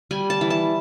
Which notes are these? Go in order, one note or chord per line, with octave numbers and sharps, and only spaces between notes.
G3 G#5
A5
E3
A5